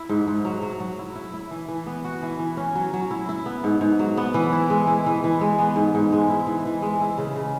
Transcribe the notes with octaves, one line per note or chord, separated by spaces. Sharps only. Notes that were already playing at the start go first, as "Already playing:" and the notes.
Already playing: E4
G#2
G#2
F#3
F#3
F#3
E4
E4
E4
E3
E3
B3
F#4
E3
E3
C#4
F#3
F#3
E4
E4
B3
G#2
G#2
F#3
B3
E3
E4
G#3
E4
E3
E3
G#3
B3
G#2
G#2
G#3
E4
E3
E3
G#3
E4
C#3
C#3